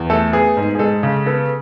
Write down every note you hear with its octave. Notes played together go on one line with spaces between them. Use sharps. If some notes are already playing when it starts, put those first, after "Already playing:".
Already playing: E2
A3 A4
B3 G#4
G#2
G#4
G#3 A4
C#3
B3 A4